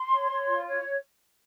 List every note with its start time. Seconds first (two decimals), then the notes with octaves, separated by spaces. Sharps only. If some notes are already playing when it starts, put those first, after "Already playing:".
Already playing: C6
0.12 C#5
0.31 C#5
0.48 F4
0.67 C#5